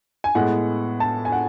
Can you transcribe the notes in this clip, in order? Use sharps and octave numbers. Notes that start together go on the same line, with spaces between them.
G#5
A2 G#3 B3 F#5
A5
G#5
F#5